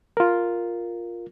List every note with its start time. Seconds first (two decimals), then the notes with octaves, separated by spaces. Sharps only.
0.17 F4 A#4